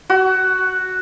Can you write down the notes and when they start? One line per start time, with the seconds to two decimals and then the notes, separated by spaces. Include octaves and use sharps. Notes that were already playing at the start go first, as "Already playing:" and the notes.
0.10 F#4